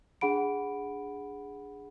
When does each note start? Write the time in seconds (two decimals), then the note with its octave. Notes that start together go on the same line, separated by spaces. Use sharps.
0.21 D4 G#4 F#5 B5 D7